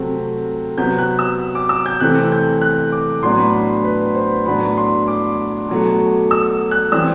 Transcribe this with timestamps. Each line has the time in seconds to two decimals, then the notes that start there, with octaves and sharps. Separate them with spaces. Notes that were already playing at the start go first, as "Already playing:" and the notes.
Already playing: C3 F#3 A3 C4
0.78 C3 F#3 B3 G6
0.98 F#6
1.19 E6
1.55 D6
1.69 E6
1.86 G6
2.00 C3 E3 A3 C4 F#6
2.32 G6
2.61 F#6
2.92 D6
3.23 A2 F#3 B3 D4 C6
3.39 B5
3.54 B5
3.84 B4
4.15 C5
4.46 A2 F#3 B3 D4 B5
4.77 C6
5.08 D6
5.68 B2 F#3 A3
6.31 E6
6.71 F#6
6.92 E3 G3 C4 E6